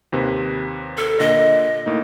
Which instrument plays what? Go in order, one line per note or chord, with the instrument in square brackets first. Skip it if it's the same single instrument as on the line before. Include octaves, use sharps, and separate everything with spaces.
[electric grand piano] D#2 C3 B4
[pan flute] A4
[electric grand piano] A#2 D3 A#6 [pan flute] D#5
[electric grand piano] A2 A#3 D#4